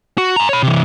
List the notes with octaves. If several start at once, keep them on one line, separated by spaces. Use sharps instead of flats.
F#4
G#5 A#5
C#5 B5
C3 E3